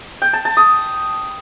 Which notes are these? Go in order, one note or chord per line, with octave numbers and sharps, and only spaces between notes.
G5
A5
A5
D#6